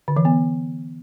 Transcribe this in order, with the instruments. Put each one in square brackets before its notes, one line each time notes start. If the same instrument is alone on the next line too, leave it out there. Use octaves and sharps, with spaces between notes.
[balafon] D3
E3
B3